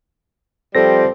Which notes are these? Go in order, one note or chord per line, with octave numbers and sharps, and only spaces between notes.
F3 G3 C4 A4 A#6